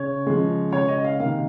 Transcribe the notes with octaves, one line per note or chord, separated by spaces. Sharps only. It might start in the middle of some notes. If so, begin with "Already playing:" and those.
Already playing: C#3 C#5
C#3 F3 G#3
C#3 G#3 C#5
D#5
F5
C3 D#3 A#3 F5